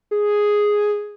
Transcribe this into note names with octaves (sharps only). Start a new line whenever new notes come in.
G#4